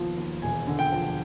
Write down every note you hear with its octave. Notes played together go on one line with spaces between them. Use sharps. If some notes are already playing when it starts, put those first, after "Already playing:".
Already playing: D#2 B2 F3
D#2
E1 G#5
D3
G5
F3